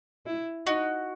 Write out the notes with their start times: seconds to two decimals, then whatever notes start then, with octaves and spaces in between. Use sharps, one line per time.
0.26 E4
0.66 D#4 F#4